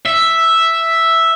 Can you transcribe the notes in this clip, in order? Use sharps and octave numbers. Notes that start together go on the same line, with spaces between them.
E5